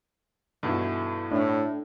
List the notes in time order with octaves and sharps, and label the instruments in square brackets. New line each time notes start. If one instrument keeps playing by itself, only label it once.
[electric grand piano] G2 B2 E3 [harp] A3 E4
[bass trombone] A2 [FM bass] D4